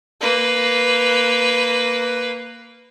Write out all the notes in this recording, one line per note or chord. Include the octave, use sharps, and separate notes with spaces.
A#3 B4